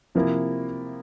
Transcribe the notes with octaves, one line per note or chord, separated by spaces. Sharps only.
C3 F3 A#3 E4